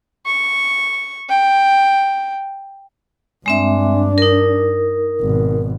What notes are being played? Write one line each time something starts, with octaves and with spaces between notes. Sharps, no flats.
C#6
G5
G2 G#3 C4 D4 E5
D#4 A#4
G#1 B2